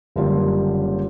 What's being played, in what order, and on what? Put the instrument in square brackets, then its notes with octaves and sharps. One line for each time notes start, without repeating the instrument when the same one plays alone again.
[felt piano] F#1 D3 G3 A#3 F4 G4